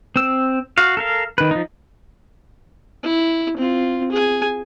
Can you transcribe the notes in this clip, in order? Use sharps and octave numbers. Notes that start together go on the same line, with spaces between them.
C4 E6
F#4 F5
A4 A#4 F5
D#3 B4
F3 D#4
E4
C4 F4
G#4 G#5